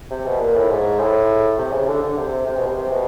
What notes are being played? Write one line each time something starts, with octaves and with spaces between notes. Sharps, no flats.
C3
B2
A#2
A2
G#2
A2
C3
C#3
D3
D3
C3
C3
B2
C3
C3
B2